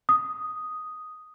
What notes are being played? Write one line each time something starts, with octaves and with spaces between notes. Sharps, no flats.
D#6